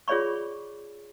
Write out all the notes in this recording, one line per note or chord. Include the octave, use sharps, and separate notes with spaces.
F4 G#4 C#5 D5 B5 C#6